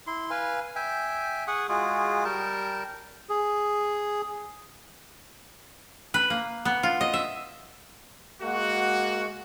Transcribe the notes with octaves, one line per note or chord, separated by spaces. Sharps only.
E4 C6
B4 F5 G#5
E5 G5 G#5
G#4 F#5 C#6 D#6
G#3 F4 F#4 G#4
G3 A#4 G5 A5
G#4
B4
A#3
B3
F4
D#5
E5
G#3 A#3 F#4